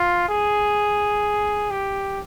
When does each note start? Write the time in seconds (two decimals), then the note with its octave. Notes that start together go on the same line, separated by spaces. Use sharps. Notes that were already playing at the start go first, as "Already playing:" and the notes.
Already playing: F4
0.29 G#4
1.70 G4